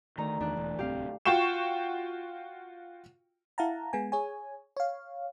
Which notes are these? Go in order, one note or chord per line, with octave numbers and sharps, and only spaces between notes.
D2 D#3 D#4 A#5
E2 D#3 D4 F#6
E1 E3
D1 C2 C4 G4 F5
F4 F#4 G5 C#6 E7
E4 F5 F#5 A5 A#5
G#3 B3 G#5
G#4 C#5 G#5
C#5 F5